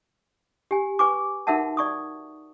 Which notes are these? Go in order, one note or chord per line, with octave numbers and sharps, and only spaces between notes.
G4 G#5
B4 G#5 C#6 D6
D#4 F#4 A#4 E5 F#5 A5
D5 C#6 D#6